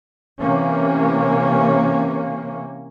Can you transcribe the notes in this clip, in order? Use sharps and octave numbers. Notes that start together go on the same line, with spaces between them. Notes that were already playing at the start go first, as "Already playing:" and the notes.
C3 E3 A#3 C#4